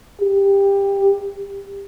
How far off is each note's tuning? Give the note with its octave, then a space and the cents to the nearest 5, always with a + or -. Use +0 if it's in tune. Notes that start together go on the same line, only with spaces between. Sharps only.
G4 +15